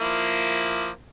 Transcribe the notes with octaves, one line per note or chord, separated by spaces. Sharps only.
F3 A#3 E4